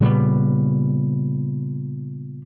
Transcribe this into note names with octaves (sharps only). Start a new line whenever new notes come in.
A#2 C#3 G3 B3